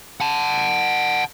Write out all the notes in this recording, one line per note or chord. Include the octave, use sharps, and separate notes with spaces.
F#5 A5